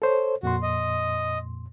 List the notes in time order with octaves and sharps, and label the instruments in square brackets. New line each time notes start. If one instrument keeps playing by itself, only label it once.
[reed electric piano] A4 C5 C#5
[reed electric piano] F2 A#2 C6 [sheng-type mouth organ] F#4
[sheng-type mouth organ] D#5